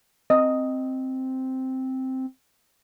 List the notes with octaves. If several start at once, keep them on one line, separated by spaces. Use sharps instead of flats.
C4 D#5